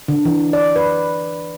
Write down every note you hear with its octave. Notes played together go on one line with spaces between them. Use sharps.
D3
E3
D5
B4